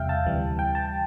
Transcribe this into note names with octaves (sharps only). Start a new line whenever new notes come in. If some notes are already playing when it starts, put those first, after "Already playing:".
Already playing: E2 C3 G3 E5 F5 G5
A5
D2 C3 E3 G3
G5
A5